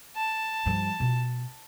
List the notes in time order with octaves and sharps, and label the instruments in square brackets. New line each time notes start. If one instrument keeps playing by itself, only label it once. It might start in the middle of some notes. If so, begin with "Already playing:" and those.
[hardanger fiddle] A5
[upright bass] G2 F3
B2 F4